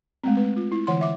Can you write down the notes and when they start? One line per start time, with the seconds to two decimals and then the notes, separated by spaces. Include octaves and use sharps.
0.24 G#3 A3 C4
0.37 B4
0.56 F4
0.72 E4
0.87 D3 E3 F#5 C6
1.01 E5 D6